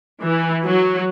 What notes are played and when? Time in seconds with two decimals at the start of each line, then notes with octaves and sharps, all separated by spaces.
0.23 E3
0.66 F#3